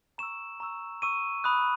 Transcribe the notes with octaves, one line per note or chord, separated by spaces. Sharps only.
A#5 C#6 E6 E7
A#5 C#6 E6
A#5 C#6 E6 D#7
B5 D#6 F#6